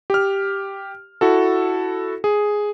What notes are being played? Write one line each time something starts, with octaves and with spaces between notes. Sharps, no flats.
G4 F6
E4 F#4 A4
G#4